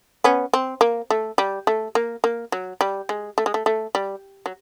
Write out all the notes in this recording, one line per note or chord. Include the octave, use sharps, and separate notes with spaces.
B3 C#4
C4
A#3
A3
G3
A3
A#3
A#3
F#3
G3
G#3
A3
G#3
A3
A3
G3
F#3